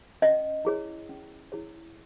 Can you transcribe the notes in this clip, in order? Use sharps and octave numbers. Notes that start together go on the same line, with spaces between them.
C#4 D#5
E4 G#4 C#5
C#4
E4 G#4 C#5